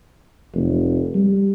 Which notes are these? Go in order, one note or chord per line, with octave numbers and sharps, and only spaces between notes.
F1
G3